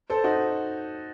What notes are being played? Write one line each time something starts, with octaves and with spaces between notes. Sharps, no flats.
A4 C5
D#4 F#4